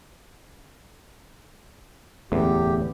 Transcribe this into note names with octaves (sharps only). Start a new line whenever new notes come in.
D1 E2 A3 C#4 G4